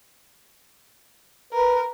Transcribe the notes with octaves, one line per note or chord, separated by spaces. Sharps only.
A#4 B4